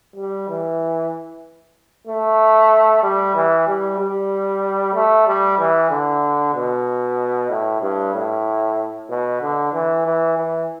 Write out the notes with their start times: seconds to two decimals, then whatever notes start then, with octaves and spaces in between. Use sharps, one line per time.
0.16 G3
0.49 E3
2.07 A3
3.03 G3
3.35 E3
3.67 G3
3.99 G3
4.94 A3
5.27 G3
5.59 E3
5.91 D3
6.55 B2
7.50 A2
7.82 G2
8.14 A2
9.09 B2
9.42 D3
9.73 E3
10.06 E3
10.38 E3